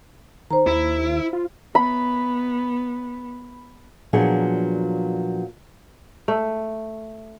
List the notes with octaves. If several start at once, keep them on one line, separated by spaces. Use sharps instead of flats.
D#3 C5 A#5
D#2 E4
F4
B3 B5
A#2 F3 F#3 B3 D4 G#4
A3